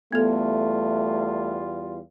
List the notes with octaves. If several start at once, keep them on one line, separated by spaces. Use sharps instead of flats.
E2 G3 A3 B3 F4 A4